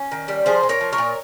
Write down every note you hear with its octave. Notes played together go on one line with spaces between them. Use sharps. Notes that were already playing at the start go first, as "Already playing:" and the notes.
Already playing: C#4
D#3
G3
F3 G#4 C5
A#2
A#4 C#5
F3
A#4 C#5
A#2